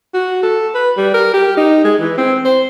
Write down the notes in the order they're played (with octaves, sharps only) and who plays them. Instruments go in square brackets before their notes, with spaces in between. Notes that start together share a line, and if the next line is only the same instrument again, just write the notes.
[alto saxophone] F#4
A4
B4
G3
A#4
G4
D#4
G#3
E3
C4
C5